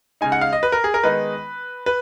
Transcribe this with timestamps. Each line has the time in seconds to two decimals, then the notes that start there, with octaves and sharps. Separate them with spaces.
0.21 C#3 G#3 D#4 G#5
0.32 F#5
0.41 F5
0.53 D#5
0.63 B4
0.72 A#4
0.84 G#4
0.94 A#4
1.03 D#3 G#3 B3 D#4 B4
1.86 B4